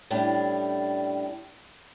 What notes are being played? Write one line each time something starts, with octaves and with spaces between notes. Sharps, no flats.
A2 G3 C#4 D4